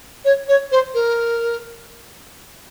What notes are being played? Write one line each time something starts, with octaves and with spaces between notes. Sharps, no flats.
C#5
C#5
C5
A#4